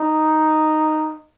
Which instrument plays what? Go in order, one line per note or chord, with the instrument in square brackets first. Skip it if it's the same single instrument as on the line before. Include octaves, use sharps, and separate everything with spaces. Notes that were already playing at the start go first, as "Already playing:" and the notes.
Already playing: [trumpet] D#4